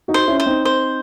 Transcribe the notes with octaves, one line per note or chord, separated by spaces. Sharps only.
D#4 F#4
C5
C#4 E4
C5
C4 D#4
C5